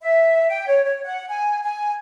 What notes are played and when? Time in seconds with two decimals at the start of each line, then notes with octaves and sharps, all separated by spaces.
0.01 E5
0.49 G5
0.67 C#5
0.84 C#5
1.03 F#5
1.29 G#5
1.64 G#5